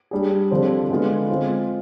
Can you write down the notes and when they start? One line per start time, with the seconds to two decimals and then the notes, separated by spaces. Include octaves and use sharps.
0.11 G3 D4 G#4
0.51 D3 F3 C4 G4
0.90 D3 G#3 B3 F4
1.29 G#3 C4 F4